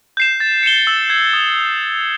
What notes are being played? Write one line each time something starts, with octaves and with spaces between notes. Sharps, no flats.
G6 C7 E7
A6
C#7 E7 G7
E6
G#6 C7
D#6